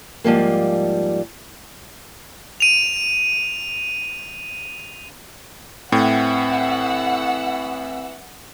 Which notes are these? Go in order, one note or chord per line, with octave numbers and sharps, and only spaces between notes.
G#2 F3 G3 A#3
D#7 F7
A2 E3 C4 F#5 E6